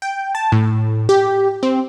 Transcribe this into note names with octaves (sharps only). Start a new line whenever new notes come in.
G5
A5
A2
G4
C4